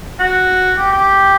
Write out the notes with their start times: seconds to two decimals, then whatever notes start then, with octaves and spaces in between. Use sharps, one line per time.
0.20 F#4
0.78 G4
0.92 G4